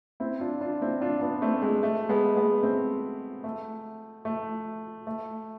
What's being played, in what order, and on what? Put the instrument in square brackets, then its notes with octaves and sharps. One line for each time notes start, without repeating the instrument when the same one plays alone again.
[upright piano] C4 E4
D4 F4
D4 F4
C4 E4
D4 F4
B3 D4
A3 C4
G#3
A3
G#3 B3
G#3 B3
A3 C4
A3
A3
A3